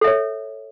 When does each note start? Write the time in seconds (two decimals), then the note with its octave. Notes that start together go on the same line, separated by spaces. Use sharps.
0.01 A4
0.04 E5
0.07 C#5